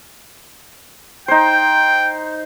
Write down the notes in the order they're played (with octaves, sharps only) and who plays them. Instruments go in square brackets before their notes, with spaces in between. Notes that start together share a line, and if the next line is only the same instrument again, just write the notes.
[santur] D#4 C5 [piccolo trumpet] G5